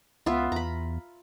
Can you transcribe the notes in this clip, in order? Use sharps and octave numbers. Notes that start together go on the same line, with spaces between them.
C#2 B3 F4 E5
E2 A#5 B5